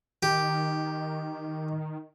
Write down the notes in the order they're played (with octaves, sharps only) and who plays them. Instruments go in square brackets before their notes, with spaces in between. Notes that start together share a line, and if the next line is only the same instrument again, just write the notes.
[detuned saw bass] D#3 [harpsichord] G4